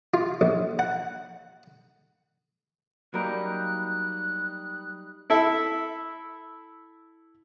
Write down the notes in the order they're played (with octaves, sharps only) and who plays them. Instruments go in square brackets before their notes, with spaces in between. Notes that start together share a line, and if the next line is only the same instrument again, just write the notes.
[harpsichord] F4
A#1
F#5
[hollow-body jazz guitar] F#3 A#3 A#4 [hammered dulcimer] G3 D#4 [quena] F#6
[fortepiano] E4 A4 E5